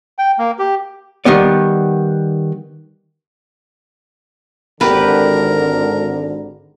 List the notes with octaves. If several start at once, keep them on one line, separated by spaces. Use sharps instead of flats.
G5
A#3
G4
D#3 G3 B3 D5
G#1 D3 G4 A#4 B4